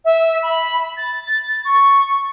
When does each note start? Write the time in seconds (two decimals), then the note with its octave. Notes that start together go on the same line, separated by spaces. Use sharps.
0.05 E5
0.43 B5
0.97 A6
1.65 C#6